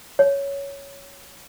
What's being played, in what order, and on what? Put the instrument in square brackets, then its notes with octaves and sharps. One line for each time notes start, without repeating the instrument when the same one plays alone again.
[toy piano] C#5